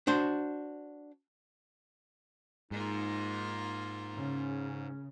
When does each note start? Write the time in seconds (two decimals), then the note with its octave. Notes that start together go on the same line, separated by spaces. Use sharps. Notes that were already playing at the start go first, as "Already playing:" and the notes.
0.07 D4 F#4 C5
2.71 G#2 A#3 D#4 F4
4.15 C#3 C#4